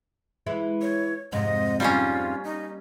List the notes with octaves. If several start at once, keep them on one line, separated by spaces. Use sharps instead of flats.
E3 G#3 E4
C#5
F2 G#2 C3 D#5
G3 A#3 C#4 F4
D#4